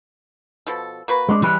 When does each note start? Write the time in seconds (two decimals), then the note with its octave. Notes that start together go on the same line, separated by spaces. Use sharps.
0.67 B2 F3 A4
1.08 A#3 F#4 B4
1.29 G#3 D4
1.42 C#3 E3 G3 G#3 B4